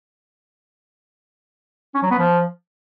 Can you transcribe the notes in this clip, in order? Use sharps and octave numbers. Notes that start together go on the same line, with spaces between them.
C#4
F#3
B3
F3